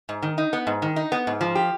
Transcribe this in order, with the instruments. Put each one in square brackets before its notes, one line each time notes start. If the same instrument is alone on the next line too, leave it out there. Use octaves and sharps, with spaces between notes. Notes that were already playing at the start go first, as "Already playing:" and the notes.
[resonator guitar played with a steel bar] G#2
D#3
D#4
B3
G#2
D#3
D#4
B3
G#2
F3
G4